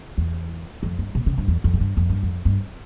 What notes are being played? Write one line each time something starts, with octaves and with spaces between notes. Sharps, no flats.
E2
F2
G2
A#2
C#3
G2
E2
F2
A2
G2
F2
G2
F2
G2